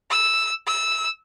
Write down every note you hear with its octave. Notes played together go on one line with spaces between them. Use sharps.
E6
E6